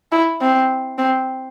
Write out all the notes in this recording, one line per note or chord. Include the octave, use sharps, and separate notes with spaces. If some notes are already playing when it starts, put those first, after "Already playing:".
E4
C4
C4